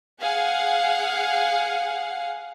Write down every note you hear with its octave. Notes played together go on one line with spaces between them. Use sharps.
G#4 F5 F#5